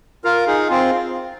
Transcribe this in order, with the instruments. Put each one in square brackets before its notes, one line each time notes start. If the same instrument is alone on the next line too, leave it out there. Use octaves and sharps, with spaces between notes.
[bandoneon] F4 A#4
D#4 G#4
C4 F4